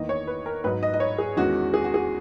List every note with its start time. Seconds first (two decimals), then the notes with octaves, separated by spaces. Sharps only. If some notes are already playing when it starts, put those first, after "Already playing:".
Already playing: E2 D#3 A#3 D#5
0.09 C#5
0.27 B4
0.46 A#4
0.64 G#2 F#3 B3 D#4 B4
0.83 D#5
0.94 D#5
1.00 C#5
1.18 G#4
1.37 E2 D#3 G#3 C#4 F#4
1.74 G#4
1.84 F#4
1.94 G#4